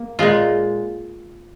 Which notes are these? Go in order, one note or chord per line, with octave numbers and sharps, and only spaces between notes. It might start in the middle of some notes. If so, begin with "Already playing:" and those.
Already playing: A#3
A#2 G#3 F4